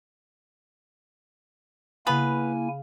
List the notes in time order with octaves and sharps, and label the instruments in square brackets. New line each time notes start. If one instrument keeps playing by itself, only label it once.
[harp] C#3 F5 [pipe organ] A#3 E4 G#5 [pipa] B3 B4